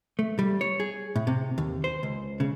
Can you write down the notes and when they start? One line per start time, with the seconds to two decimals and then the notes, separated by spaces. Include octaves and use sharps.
0.19 A3
0.39 G3
0.61 C#5
0.80 G#4
1.16 A2
1.27 C3
1.58 D#2
1.84 C5
2.03 C#2
2.40 C#3